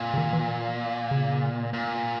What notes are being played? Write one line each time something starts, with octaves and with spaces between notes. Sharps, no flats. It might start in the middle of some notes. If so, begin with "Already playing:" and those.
Already playing: A#2
C#3
D#3
E3
C#3
A#2